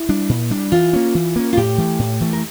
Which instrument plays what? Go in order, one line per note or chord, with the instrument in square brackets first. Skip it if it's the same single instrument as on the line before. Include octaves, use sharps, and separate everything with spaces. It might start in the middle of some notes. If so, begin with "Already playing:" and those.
Already playing: [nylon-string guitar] E4
[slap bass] G3 D4
A#2
G3 D4
[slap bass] E3 [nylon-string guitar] F4
[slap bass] A#3 C#4
E3
A#3 C#4
[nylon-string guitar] F4
[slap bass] A2 [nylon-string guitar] G4
[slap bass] E3 A3
A2
E3 A3
[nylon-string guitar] A#4